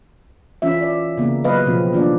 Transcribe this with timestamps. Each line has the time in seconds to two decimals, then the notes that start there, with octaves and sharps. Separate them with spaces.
0.62 E3 C#4 F4 E5
0.81 D5
1.18 C#3 A#3 B3
1.44 F#3 B4 D#5 F5
1.66 B2 F3 C4 F4
1.93 D#3 A#3 D4 F4 D5